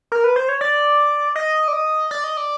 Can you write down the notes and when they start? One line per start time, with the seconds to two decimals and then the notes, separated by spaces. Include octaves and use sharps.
0.12 A#4
0.24 B4
0.36 C5
0.49 C#5
0.61 D5
1.36 D#5
1.68 D5
1.73 D#5
2.11 D5
2.24 D#5
2.37 D5